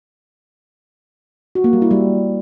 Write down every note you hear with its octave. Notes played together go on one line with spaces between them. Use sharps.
F#4
A#3
G3
E4
G3